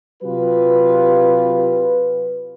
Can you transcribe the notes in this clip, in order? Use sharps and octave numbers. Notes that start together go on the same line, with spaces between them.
C3 F#3 F4 G4 B4